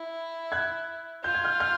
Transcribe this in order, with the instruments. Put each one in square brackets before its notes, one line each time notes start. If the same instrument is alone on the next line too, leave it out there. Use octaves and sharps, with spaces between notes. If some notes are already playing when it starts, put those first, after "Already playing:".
Already playing: [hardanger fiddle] E4
[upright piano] F#6 G#6
[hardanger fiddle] F4 [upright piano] G6
[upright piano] G#6
F6 G6
F6 G6